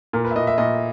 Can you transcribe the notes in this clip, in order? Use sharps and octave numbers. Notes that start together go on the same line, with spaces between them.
A#2 A#4
B4
E5
A#2 D#5
E5
A#2 D#5